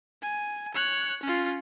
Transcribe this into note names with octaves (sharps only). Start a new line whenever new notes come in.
G#5
C#5 F#6
C#4 F4